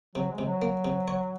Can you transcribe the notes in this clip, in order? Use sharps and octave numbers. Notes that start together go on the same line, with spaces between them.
C3 F#3
G#3
C3
F#3
A#3
C3
C#5